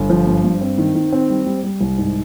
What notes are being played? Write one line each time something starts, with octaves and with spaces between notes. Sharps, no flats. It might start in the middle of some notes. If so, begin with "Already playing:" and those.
Already playing: G1
F3
G2
G2
C4
D#3
D#3
C4
G3
G3
G3
C2
G#2